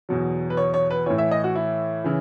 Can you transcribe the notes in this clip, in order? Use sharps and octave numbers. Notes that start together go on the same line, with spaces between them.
E2 B2 F#3
B4
C#5
C#5
B4
A2 E3 C#5
E5
D#5
F#4
E4
C#3 E3